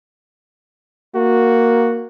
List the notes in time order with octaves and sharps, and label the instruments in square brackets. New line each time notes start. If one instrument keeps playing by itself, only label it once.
[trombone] A#3 [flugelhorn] F#4